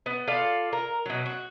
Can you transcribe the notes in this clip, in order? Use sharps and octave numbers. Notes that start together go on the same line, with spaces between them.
B3
F4 A4 D5 F5
A#4
B2 F#3
F#4